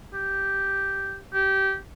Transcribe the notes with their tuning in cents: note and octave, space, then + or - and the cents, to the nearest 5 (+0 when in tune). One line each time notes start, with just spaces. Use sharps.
G4 -5
G4 -20